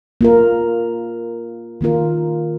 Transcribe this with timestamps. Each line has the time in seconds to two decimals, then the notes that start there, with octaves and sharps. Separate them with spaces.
0.21 A#3 F4 A#4
1.81 D#3 A#3 F4 A#4